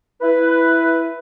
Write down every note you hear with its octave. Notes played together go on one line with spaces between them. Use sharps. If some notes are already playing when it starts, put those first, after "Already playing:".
E4 B4